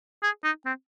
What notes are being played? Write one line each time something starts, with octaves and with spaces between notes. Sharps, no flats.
G#4
D#4
C4